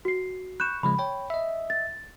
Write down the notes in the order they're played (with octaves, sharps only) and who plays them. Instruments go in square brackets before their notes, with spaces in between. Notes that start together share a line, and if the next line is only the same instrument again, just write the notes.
[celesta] F#4 C7
[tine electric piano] B5 C#6 [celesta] F#6 G6 E7
[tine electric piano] C#3 F3 G#3 [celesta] B5
[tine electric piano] C#5 G5
D#5 E5
[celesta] A6